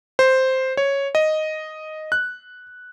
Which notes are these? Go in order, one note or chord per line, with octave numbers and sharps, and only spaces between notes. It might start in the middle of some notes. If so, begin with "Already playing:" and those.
C5
C#5
D#5
F#6